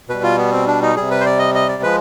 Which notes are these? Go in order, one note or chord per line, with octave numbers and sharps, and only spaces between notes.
B2 G3 B4
F4
B3
C4
D4
D#4
C3 G3 G#4
B4
C5
D5
D#5
D#5
D5
F3 G#3 B4